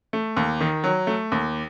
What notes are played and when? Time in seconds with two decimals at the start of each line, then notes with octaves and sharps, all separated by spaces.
0.13 A3
0.36 D#2
0.61 D#3
0.84 F#3
1.07 A3
1.32 D#2